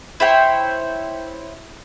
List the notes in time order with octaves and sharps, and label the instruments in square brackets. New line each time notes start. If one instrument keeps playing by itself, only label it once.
[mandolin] E4 C5 C#5 G5